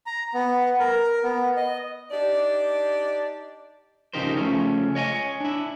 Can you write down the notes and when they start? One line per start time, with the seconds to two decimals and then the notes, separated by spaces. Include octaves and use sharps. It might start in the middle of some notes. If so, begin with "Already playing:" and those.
0.06 A#5
0.34 B3
0.80 A#4
1.23 B3
1.56 D#5
2.11 D4 D#4 G4 D5
4.13 C#3 F3 D#4 G4 A#4 C5
4.37 C#3 F3 A3 C#4
4.95 C#5 D#5 F5 G#5
5.40 D4 E4